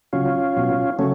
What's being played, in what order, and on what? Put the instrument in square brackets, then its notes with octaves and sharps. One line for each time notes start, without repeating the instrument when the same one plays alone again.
[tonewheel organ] C#3 F#3 C#4 F4
B2 F#3
C#3 F#3 A3 C#4